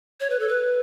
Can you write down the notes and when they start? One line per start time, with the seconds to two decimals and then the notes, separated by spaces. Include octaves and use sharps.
0.20 C#5
0.30 B4
0.39 A4
0.49 B4